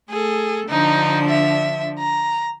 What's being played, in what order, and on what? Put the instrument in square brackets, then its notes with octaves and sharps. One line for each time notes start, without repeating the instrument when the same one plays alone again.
[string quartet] A3 A4 [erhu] G#4
[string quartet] D3 F3 D4 [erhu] D#4
[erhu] E5
A#5